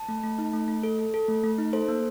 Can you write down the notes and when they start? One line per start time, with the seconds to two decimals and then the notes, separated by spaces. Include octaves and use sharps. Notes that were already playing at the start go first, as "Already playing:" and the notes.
Already playing: A5
0.09 A3
0.24 A3
0.38 D#4
0.53 A3
0.68 A3
0.83 A4
0.99 A4
1.14 A4
1.28 A3
1.44 A3
1.58 D#4
1.73 A4 C5
1.88 A#3